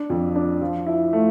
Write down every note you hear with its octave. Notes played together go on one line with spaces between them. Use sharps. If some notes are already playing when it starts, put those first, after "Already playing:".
Already playing: D4
F2
D4
F3
E4
A3